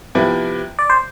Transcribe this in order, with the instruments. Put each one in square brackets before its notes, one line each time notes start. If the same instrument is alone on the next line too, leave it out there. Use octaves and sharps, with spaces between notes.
[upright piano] C3 F3 B3 E4
[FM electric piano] D5
C5